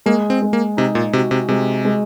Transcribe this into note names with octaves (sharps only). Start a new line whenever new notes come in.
G#3 A#3
C4
G#3
A#3
C3 D#4
A#2
C3 F#4
C3
C3 G#3
G#3